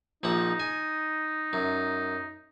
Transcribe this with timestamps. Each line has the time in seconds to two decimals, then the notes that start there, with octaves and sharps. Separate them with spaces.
0.23 A#1 F3 D#4 F#5
0.60 G#5
1.53 F#2